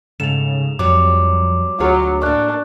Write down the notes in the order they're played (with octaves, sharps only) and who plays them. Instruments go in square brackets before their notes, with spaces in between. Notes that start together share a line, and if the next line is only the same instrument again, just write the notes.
[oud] G#2 A3 [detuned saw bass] C#3 [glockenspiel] E7 F7
[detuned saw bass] F2 [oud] F#3 G3 [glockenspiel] D6
[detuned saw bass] D2 [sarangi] F#3 [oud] F4 G#4 C#5
[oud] A2 A#3 [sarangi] D4 [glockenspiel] C#6 F#6